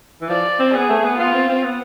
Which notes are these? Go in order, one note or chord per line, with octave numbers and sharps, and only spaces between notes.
E3
F3 D5
C4
B3 G#4
A3
B3
B3 F4
C4
C4
B3